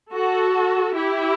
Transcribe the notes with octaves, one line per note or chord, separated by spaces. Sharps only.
F#4 A4
E4 G4